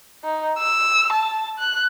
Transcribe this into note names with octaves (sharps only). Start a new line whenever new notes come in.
D#4
E6
A5
F#6